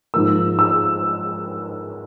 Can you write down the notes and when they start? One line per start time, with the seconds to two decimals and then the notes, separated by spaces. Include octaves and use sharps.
0.14 G#2 F3 A#3 E6
0.59 E6